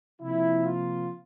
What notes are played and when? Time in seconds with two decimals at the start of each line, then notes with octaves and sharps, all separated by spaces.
0.21 C3 F3 A#3 E4
0.66 F4